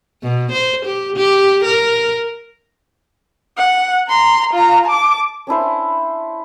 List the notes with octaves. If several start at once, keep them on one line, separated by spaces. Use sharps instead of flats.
B2
C5
G4
G4
A#4
F#5
A#5 C6
F4 A#5
A5 D6
C#4 D4 E4 C5